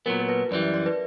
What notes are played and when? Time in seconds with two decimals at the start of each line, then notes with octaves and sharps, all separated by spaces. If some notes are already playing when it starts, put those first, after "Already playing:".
0.06 A#2 F#3 B3 A#4
0.20 A#4
0.29 B4
0.51 F#2 E3 G3 D5
0.62 E5
0.74 D5
0.86 B4